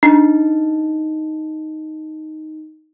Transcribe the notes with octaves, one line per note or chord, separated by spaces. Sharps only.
D4 D#4